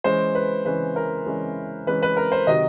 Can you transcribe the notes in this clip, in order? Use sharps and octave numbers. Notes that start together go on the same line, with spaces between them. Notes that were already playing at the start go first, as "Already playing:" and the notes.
E3 G#3 C#4 C5
B4
E3 G#3 C#4 B4
A#4
E3 G#3 C#4
E3 G#3 C#4 B4
B4
A#4
C5
C3 D#3 F#3 D#5